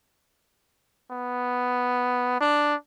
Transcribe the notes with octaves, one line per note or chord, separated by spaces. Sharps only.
B3
D4